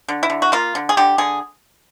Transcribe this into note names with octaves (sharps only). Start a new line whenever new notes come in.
D3
E4
D3
F#4
A#3 F4
D3
G#4
D3 G4
D3 G#4